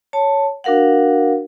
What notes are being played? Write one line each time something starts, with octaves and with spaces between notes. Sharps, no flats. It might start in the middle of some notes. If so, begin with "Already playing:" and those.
C#5 A5
D4 F#4 A#4 F5 F#5